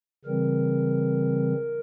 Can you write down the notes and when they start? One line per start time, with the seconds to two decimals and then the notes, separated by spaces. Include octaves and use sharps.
0.25 C#3 E3 G3 C4 A#4